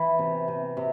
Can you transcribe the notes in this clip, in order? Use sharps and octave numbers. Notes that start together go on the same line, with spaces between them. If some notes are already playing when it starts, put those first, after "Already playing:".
Already playing: E3
C3
C3
C3